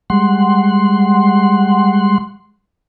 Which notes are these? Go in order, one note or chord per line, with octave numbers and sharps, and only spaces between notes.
G3 G#3 F#5 C6